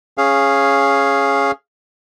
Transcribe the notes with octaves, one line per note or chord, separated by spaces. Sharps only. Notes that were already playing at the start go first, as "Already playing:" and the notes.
C#4 G#4 F5